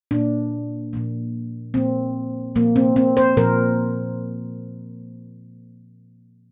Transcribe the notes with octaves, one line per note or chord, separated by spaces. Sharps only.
A#2 A#3 D4
A#2 F3 A#3
A#2 F3 A#3 C4
A#2 F3 A#3
C4
C4
C5
A#2 F3 A#3 A#4